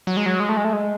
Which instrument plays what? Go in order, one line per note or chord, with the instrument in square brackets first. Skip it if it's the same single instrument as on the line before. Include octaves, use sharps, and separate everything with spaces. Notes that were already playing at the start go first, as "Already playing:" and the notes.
[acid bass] F#3
G#3
F#3
G#3
A3
G#3
A3
G#3